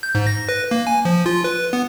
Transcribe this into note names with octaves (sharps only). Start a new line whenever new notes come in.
G6
G#2
A#6
B4
A#3
G#5
F3
F4
B4
B3